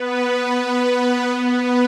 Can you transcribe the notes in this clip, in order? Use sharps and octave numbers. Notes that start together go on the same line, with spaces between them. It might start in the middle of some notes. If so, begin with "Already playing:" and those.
Already playing: B3 B4
B3 B4
B3 B4
B3 B4
B3 B4